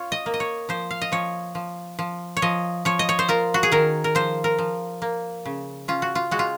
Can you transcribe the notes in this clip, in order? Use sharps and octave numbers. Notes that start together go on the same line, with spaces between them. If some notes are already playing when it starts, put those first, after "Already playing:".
Already playing: F4 C#5 F5
D#5
A#3
D#5
C#5
F3 C5
F5
D#5
F3 C#5
F3
F3
C#5
F3 D#5
F3 C#5
D#5
C#5
C5
F4 A#4
F#4
G#4
D#3 A#4
A#4
F3 C5
A#4
F3
A#3
C#3
C#4 F4
F#4
F4
G#3 F#4
F4